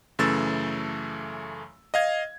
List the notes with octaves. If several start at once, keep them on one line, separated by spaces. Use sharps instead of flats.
F#2 C#3 E3 A3 E6 A6
D#5 F5 G#6